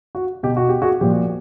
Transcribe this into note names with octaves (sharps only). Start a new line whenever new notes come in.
F#4
B2 G4
F#4
G4
F#4 G#4
A#2 F3 G4